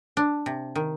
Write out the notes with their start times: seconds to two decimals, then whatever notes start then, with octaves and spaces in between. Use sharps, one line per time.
0.17 D4
0.46 C3
0.75 D#3